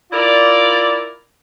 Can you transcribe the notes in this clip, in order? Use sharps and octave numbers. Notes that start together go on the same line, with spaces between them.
E4 F4 A#4 D5